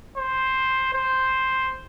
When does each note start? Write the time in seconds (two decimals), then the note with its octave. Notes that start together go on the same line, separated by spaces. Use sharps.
0.18 C5
0.94 C5